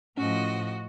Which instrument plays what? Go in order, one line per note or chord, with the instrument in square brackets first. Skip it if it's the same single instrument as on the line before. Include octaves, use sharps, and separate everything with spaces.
[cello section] A2 F3 [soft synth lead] C#4 [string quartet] F#4 D#5